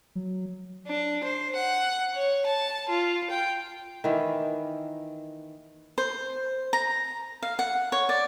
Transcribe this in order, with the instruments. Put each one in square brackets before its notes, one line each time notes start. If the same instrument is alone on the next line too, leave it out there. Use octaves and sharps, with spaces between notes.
[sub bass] F#3
[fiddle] D4
C5
F#5
C#5
A5
F4
G5
[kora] D#3 E3 A#3
[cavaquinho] C5
A#5
F5
F#5
C#5
D5